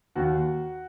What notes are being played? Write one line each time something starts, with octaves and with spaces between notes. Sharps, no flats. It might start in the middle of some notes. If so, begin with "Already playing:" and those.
D#2 F#4